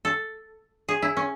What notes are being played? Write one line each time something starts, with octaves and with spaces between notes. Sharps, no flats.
A4
G#4
E4
C#4